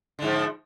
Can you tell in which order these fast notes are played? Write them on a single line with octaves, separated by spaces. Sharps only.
D3 G#2 F3